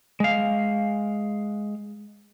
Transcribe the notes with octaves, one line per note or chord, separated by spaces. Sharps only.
G#3 F5